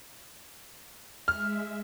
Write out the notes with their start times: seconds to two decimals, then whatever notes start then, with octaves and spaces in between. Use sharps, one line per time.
1.28 G#3 E5 F6